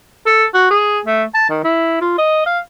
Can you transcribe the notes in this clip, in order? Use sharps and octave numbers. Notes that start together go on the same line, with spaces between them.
A4
F#4
G#4
A3
A5
D#3
E4
F4
D#5
F5